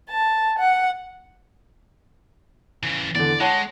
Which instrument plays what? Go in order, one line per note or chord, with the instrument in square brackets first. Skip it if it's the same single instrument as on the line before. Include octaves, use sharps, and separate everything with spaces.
[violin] A5
F#5
[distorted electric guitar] C#3 E3
[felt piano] E2 D3 [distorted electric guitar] D5
[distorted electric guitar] G#3 [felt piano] C#5 F#5 A5